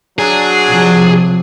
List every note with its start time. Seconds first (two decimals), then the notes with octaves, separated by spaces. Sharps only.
0.19 F#3 D4 G#4
0.71 C3 F3